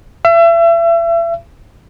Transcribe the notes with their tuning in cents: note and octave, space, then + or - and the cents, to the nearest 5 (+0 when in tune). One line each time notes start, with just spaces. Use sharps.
E5 +35